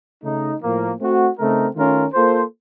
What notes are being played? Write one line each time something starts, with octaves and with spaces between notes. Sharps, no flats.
C#3 A3 D#4
A2 F3 A#3
A3 C4 F#4
C#3 A3 C4 D#4 A#4
D#3 A3 C#4 F4 A#4
A#3 F4 A4 C5